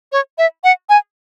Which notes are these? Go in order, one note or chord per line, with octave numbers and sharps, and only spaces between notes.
C#5
E5
F#5
G#5